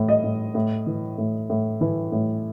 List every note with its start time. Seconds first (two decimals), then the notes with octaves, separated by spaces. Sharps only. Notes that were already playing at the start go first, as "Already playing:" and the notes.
Already playing: A2 E3
0.08 D#5
0.24 A2
0.55 A2
0.87 E3
1.18 A2
1.50 A2
1.81 E3
2.12 A2